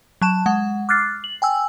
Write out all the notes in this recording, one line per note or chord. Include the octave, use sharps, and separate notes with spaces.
F#3 A5 E7
G#3 F#5
D6 F6 F#6 A6 C7
F#7
G5 G#5 E6